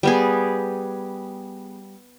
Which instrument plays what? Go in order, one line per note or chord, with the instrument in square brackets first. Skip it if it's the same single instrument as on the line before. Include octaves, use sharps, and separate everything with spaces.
[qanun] G3 B3 G#4